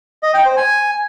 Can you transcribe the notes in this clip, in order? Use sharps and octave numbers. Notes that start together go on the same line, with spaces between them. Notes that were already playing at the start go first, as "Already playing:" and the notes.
D#5
G5
C5
G#5